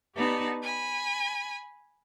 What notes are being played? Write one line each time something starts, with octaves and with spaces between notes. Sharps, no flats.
B3 D#4 G4 D5 A5
G#5 B5